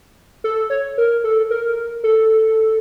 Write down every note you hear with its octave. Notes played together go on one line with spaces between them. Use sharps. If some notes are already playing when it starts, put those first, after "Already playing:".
A4
C#5
A#4
A4
A#4
A4